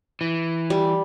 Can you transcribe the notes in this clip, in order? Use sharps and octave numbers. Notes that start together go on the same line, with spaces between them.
E3
G3